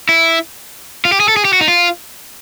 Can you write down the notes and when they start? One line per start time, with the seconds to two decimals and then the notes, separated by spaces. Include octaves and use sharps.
0.09 E4
1.05 F4
1.12 G4
1.20 G#4
1.28 A4
1.37 G#4
1.45 G4
1.53 F#4
1.61 D#4
1.68 F4